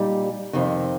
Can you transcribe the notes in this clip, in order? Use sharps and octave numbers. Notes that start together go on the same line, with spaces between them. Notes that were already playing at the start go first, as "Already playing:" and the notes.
Already playing: A#2 G3 D#4
F2 C3 D#3